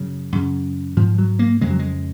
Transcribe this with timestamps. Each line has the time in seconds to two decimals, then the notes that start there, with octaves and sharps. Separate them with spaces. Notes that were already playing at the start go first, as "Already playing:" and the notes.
Already playing: F#2 C#3 F#3
0.32 F#2 C#3
0.97 G#2 F3
1.18 F#3
1.39 A#3
1.61 F2 C#3 G#3
1.70 F#3
1.79 G#3